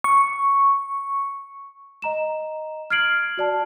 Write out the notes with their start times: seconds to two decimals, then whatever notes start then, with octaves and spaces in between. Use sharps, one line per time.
0.04 C#6
2.02 D#5 A#5 E7
2.90 F6 G#6 C7 D7 F#7
3.37 F#4 D5 A5